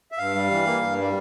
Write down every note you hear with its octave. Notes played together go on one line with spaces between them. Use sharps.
E5
G2 F5
G3
E3
A#3
G2
G3